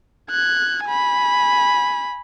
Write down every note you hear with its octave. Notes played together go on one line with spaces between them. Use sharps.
F#6 G#6
G#5 B5